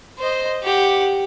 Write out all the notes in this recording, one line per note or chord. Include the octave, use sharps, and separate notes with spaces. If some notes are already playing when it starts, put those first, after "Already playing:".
C5 D#5
G4 F#5